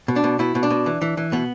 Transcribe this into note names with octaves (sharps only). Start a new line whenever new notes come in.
B2
D4
B2
B2 E4
B2
D4
B2
E3
E3
E3
B2 B3